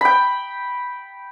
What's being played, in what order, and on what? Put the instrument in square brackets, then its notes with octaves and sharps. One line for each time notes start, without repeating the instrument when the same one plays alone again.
[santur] G5 B5